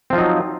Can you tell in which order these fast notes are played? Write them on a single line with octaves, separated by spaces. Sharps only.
C4 F3 F4 D#4 F#3